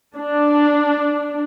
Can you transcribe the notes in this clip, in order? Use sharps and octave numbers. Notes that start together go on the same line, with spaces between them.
D4